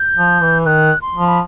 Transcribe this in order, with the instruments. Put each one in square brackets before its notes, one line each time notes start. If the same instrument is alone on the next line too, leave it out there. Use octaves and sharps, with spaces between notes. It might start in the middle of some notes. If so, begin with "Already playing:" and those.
Already playing: [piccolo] G6
[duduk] F3
E3
[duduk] D#3 [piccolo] F#6
[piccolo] C6
[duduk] F3
[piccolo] B5